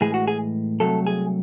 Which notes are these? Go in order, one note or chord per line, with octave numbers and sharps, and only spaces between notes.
A2 E3 G#3 G#4
F#4
G#4
C2 C3 D#3 F#3 A3 A4
G#4